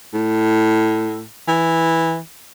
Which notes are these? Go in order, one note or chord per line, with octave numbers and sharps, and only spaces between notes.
A2
E3